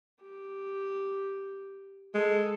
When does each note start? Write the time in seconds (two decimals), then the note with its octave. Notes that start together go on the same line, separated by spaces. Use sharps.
0.22 G4
2.15 G#3 A4